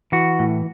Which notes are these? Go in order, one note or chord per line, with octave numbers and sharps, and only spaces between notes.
E3 F#4
A2